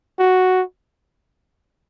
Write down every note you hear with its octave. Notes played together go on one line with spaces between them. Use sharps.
F#4